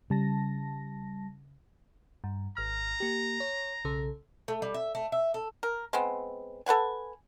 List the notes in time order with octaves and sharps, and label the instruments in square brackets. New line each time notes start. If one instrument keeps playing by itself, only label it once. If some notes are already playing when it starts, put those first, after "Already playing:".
[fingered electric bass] C#3 [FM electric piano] G3 A5 A#6
[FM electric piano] G2
[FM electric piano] G#1 F6 [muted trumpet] A#5
[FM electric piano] A#3 G4
C#5
B1 C#3 A4
[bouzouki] A3
G3
E5
A3
E5
A4
[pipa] A#4
G#3 B3 C4
A4 B4 F#5 G#5